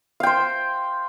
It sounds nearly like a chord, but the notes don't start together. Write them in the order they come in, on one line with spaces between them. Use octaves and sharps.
F5 G5 C5